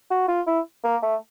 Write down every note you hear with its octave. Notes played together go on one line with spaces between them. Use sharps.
F#4
F4
E4
A#3
A3